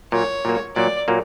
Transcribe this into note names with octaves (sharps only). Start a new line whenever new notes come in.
A#2 F#3 A#3 C#5
A#2 F#3 A#3
A#2 F#3 A#3 D5
A#2 F#3 A#3